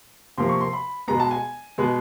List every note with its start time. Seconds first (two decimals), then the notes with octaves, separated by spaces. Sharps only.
0.38 C3 F3 A#3 C6
0.49 C#6
0.61 C6
0.73 B5
1.08 B2 G#3 B3 A#5
1.20 A5
1.31 G#5
1.78 B2 G#3 B3